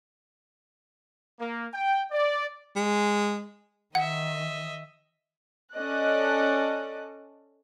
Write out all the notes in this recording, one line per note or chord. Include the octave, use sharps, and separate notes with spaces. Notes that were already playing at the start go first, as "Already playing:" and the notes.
A#3
G5
D5
G#3
D#3 D#5 E5 F#5
C#4 A4 D5 D#5 F#6